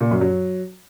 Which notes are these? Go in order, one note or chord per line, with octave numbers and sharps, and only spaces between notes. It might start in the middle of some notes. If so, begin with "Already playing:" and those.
A#2
F#2
F#3